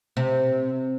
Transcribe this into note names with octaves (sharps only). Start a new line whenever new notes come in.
C3